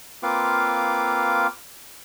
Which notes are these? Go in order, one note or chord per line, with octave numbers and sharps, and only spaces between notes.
A#3 C4 F4 B4 F5 D6